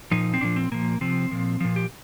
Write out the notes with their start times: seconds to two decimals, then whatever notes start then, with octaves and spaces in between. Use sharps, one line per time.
0.11 A#2 F3 D#4
0.34 C4
0.41 A#2 F3 D4
0.56 C4
0.71 A#2 F3 A#3
1.01 C3 F3 C4
1.31 A#2 F3
1.60 A#2 F3
1.76 G4